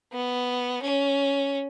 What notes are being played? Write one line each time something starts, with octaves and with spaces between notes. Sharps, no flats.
B3
C#4